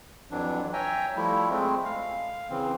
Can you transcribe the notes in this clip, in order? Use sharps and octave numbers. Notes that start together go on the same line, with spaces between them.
F2 E3 F#3 D4
C#5 E5 G5 G#5 A#5
F3 G3 A3 E4
G#3 A3 C4
F5
C#3 E3 C4